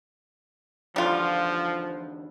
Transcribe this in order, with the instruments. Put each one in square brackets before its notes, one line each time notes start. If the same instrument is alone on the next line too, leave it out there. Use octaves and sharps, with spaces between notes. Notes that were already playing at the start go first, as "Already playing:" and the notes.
[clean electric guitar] E2 D3 [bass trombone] F3 [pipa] G3 F4